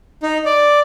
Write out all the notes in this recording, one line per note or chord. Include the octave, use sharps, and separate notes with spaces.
D#4
D5